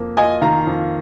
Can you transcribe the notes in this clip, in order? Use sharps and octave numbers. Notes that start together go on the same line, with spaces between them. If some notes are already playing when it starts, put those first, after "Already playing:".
Already playing: F2 A#3
F4 D#5 G#5
D#3 F5 A#5
F2